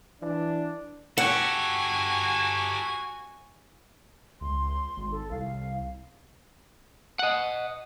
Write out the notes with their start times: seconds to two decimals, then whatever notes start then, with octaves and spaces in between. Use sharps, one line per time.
0.22 E3 D4
1.18 F#4 G4 A4 F#5 G#5
4.41 C#2 C6
4.97 G#1
5.12 A4
5.31 C2 F5
7.19 D#5 F#5